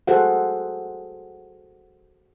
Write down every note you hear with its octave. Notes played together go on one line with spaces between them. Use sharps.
F#4 G#4 A4 C5 F5 F#5